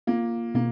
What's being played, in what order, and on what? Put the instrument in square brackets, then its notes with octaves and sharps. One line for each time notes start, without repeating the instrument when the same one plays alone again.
[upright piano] A#3 [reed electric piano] F4
[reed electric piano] B2 [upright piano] A#3